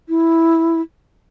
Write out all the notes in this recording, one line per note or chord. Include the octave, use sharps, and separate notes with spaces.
E4